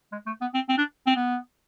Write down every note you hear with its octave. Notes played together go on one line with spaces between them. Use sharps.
G#3
A3
B3
C4
C4
D4
C4
B3